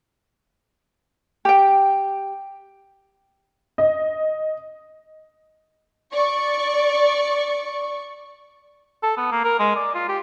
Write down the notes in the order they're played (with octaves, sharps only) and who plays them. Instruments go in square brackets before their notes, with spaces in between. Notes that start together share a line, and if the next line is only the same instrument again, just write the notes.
[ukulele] G4 G5
[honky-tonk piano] D#5
[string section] D5 C#6
[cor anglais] A4
B3
A#3
A#4
G#3
D5
F4
G4